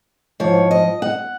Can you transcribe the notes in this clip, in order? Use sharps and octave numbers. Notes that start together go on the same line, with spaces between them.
G#2 F3 C#5
D#5
F#5